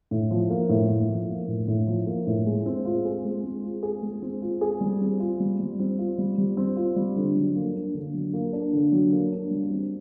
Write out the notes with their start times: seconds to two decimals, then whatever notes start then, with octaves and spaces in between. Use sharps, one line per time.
0.11 A2
0.31 F3
0.50 A#3
0.69 A2
0.89 A2
1.09 F3
1.29 A#3
1.48 A2
1.68 A2
1.87 F3
2.07 A#3
2.27 A2
2.46 G#3
2.66 C4
2.85 F4
3.05 G#4
3.24 G#3
3.44 C4
3.64 F4
3.83 G#4
4.02 G#3
4.22 C4
4.42 F4
4.61 G#4
4.81 G3
5.01 C4
5.20 F4
5.40 G3
5.60 G3
5.79 C4
5.99 F4
6.18 G3
6.38 G3
6.57 C4
6.77 F4
6.96 G3
7.16 D3
7.36 F#3
7.56 A#3
7.75 D4
7.95 D3
8.14 F#3
8.33 A#3
8.53 D4
8.73 D3
8.92 F#3
9.12 A#3
9.32 D4
9.51 G3
9.71 C4